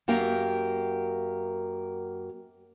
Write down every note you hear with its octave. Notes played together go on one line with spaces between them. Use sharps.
F#2 A#3 G4 A#4 F5